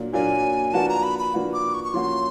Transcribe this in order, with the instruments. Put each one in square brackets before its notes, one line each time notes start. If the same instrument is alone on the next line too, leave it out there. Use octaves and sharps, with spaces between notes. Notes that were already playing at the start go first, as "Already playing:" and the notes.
Already playing: [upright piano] A#2 F#3 A#3 D4
[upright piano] A#2 F#3 A#3 D4 [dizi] G#5
[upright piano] F3 A#3 D4 F#4 B4 [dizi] A5
[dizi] A#5
B5
B5
[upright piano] F3 A#3 D4 F#4 B4
[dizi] D6
C#6
C#6
[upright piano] F3 A#3 C#4 F#4 [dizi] C6